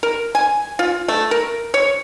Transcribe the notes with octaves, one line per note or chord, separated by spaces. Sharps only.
A#4
G#5
F4
A3
A#4
C#5